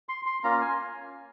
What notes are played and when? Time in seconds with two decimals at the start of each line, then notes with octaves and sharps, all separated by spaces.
0.09 C6
0.26 C6
0.44 A#3 C#4 F4 A#5
0.61 G#5